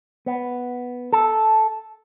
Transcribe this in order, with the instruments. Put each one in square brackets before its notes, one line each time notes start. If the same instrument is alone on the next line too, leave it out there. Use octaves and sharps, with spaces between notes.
[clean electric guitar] B3
A4